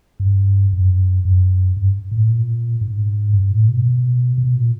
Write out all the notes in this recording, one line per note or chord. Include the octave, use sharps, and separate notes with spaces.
G2
F#2
F#2
G2
A2
A#2
G#2
G2
A2
B2
B2
B2
A#2